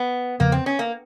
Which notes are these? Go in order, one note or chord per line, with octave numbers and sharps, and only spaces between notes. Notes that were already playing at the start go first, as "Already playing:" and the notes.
Already playing: B3
E2 C#3 F3 A#3
C4
C#4
A#3